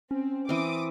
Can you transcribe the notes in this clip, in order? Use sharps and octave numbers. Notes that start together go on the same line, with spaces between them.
C4 C#4
E3 C4 D6 D#6